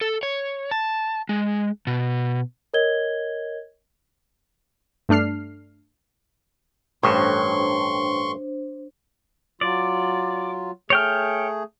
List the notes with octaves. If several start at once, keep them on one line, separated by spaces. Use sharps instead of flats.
A4
C#5
A5
G#3
B2
A#4 C#5 D#5 G#6 G7
G2 A3 D4 F6 C7
A1 G2 D4 C5 C#5 C6 C#6
F#3 F4 D5
A3 G#4 C#5 G5 F6